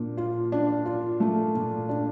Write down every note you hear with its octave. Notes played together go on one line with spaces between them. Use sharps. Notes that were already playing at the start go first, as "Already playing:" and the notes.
Already playing: A#2 D4
F4
D4
F4
A3
A#2
D4